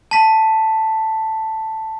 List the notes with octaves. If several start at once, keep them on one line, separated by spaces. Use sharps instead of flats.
A5 B6